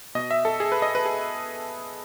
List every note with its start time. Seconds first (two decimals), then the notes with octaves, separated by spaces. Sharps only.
0.15 B2 D#5
0.31 E5
0.45 A4
0.60 G#4
0.72 B4
0.82 D#5
0.95 B4
1.05 G#4